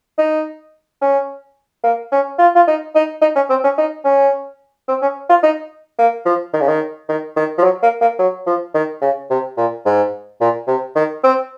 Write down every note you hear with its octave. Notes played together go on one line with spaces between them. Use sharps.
D#4
C#4
A#3
C#4
F4
F4
D#4
D#4
D#4
C#4
C4
C#4
D#4
C#4
C4
C#4
F4
D#4
A#3
F3
D#3
C#3
D#3
D#3
D#3
F3
F#3
A#3
A#3
F#3
F3
D#3
C#3
C3
A#2
G#2
A#2
C3
D#3
C4